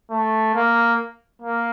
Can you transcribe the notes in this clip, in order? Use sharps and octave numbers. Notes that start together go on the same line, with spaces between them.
A3
A#3
A#3